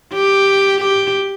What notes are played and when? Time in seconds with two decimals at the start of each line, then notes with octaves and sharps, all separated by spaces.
0.14 G4
0.81 G4